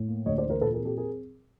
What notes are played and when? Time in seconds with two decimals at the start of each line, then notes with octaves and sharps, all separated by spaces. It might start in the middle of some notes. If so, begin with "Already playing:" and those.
Already playing: A2
0.08 A#3
0.26 D2 C#5 D#5
0.38 C5 D5
0.44 E3
0.50 A#4 C5
0.61 A#2 A4 B4
0.74 G#4 A#4
0.80 C4
0.85 G4 A4
0.98 G#4 A#4